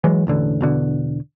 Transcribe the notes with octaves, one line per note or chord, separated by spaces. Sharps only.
E3 F#3 G#3
E1 A1 D3
E1 B2 D3